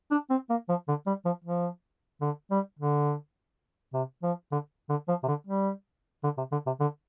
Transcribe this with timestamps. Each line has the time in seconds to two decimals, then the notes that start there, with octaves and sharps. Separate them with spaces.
0.11 D4
0.30 C4
0.50 A#3
0.69 F3
0.88 D3
1.07 G3
1.25 F3
1.44 F3
2.21 D3
2.51 G3
2.79 D3
3.93 C3
4.23 F3
4.52 D3
4.89 D3
5.08 F3
5.23 C3
5.28 D3
5.47 G3
6.24 D3
6.38 C3
6.52 D3
6.66 C3
6.81 D3